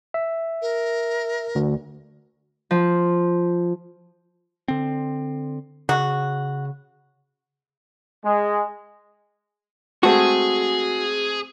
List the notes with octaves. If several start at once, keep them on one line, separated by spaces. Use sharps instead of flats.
E5
A#4
D2
F3
D3 C4
C#3 F#4
G#3
G#3 A3 C4 F#4 G#4